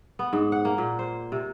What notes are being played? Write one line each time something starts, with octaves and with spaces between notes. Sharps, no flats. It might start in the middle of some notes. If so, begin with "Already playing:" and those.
B3
G#2
F#5
A#3
A#2
C5
C3